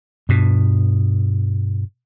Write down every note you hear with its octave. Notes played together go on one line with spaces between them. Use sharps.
G2 B2